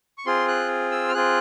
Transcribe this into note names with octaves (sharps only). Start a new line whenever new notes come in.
C#6
C4 F4 G#4 C6
F#6
E6
F6
C4 F4 G#4 F#6